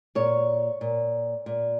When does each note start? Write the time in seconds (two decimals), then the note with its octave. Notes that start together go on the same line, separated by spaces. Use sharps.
0.15 A#2 C#5
0.81 A#2
1.46 A#2